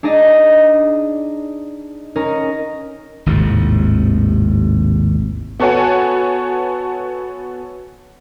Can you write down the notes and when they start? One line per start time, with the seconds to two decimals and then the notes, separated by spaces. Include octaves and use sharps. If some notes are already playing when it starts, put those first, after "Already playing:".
0.03 D4 D#4 G#4 D5 D#5
2.15 C#4 D#4 A#4
3.26 G#1 D#2 A2 C3
5.60 B3 F#4 A4 C#5 F#5 G#5